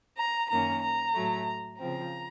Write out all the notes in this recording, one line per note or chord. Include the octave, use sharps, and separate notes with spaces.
A#5
F#2 D#3 A#3 C#4 A#5
A#5
A2 F#3 A3
C#3 F3 C4 A#5